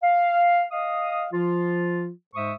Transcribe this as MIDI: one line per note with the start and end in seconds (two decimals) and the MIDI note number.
0.03 0.64 77
0.71 1.26 75
0.71 1.26 77
0.71 1.26 87
1.32 2.10 53
1.32 2.10 65
2.35 2.53 44
2.35 2.53 56
2.35 2.53 72
2.35 2.53 76
2.35 2.53 85
2.35 2.53 87